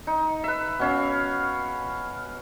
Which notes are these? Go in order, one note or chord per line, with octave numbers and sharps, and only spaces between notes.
D#4
B4 E5
B2 C#4 F5